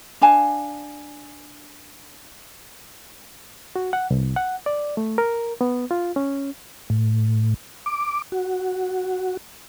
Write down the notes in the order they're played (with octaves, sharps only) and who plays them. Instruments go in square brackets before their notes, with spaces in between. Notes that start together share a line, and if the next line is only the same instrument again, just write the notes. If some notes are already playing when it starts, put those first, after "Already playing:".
[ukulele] D4 F5 G#5 A5
[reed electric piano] F#4
F#5
C2
F#5
D5
A3
A#4
B3
F4
C#4
[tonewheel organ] A2
D6
F#4